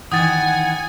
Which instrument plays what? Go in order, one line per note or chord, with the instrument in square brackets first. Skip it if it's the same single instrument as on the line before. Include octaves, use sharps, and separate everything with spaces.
[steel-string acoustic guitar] D#3 E3 [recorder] F#5 [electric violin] G#5 [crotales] D#6 A6